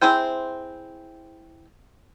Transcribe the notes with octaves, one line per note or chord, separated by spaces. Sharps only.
C4 E4 G#4 C5 G5